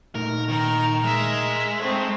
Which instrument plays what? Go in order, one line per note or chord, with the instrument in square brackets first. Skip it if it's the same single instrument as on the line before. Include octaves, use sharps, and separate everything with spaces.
[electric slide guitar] A#2 A3 D#4 [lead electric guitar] A#4
[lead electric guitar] D#3 [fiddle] A#4
[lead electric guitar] G#3 [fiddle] A#4 E5
[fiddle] A3 C4 [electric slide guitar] A4 C5 E5